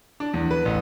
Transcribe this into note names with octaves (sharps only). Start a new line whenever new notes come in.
D4
E2
B4
A1